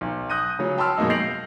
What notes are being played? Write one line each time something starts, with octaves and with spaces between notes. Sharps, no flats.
B1
D#6 F#6 G6 A#6 D#7
C#3 F#3
G5 A5 B5 C6 E6 F6
F#2 B2 G#3 A#3 D#4
G6 A#6 C7 D7 F7 F#7